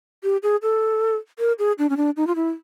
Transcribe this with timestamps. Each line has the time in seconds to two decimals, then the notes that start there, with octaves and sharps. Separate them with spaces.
0.23 G4
0.43 G#4
0.62 A4
1.39 A#4
1.59 G#4
1.79 D4
1.90 C#4
1.97 D4
2.17 D#4
2.27 F4
2.35 E4